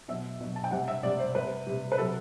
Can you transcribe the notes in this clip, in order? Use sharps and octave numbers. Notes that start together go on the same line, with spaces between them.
B2 F#3 E5
B2 F#3
A5
G5
C3 G3 F#5
E5
C3 G3 D5
C5
C3 G3 B4
C3 G3
B4
C3 F#3 A4